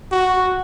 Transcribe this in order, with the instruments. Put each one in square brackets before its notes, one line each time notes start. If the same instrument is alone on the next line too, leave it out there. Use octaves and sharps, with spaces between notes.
[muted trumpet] F#4